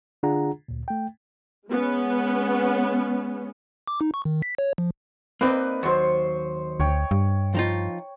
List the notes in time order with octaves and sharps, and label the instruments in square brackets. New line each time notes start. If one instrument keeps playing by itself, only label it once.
[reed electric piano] D3 D4 F4 G#4 F#5 A#5
D2 A#2
A3 G5
[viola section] G#3 B3 C#4
[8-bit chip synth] D6
D#4
C#6
D#3
B6
C#5
F3
[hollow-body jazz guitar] A#3 C4 D#4 [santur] B4 D5 D#5
[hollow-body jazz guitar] D#2 F#3 [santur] C5 C6 C#6
[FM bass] D2 [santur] C#5 G5
[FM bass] G2
[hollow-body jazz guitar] F3 D#4 F4